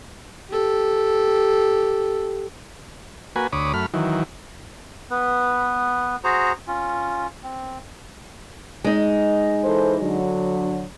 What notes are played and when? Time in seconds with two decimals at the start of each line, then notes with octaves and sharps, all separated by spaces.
0.49 G4 A4
3.36 A#3 F#4 B4 G#5
3.53 D2 C#5 B5 D6 D#6
3.74 F#2 A3 B5 F6
3.94 D#3 E3 F#3
5.11 B3 B4
6.24 F#4 G#4 C5 A#5
6.68 C#4 F4
7.43 C4
8.84 G#3 D#4
9.64 E3 A4 C5
10.01 D3 F#3